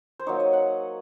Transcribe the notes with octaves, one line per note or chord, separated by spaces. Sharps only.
C5
F#3 A#3 D#4 C#5
D#5
F#5